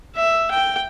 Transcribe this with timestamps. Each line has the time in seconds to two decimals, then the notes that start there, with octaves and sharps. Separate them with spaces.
0.16 E5
0.51 G5